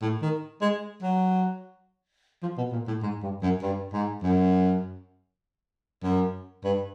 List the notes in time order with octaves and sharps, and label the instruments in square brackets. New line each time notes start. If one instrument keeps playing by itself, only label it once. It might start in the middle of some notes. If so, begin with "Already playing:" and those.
[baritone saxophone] A2
D#3
G#3
F#3
F3
B2
A#2
A2
G#2
G2
F#2
G2
G#2
F#2
F#2
G2